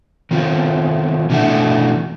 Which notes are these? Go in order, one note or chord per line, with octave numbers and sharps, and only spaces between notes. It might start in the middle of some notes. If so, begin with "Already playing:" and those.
D#3 B3 C4 F4
B2 E3 A3 D4 E5 F#5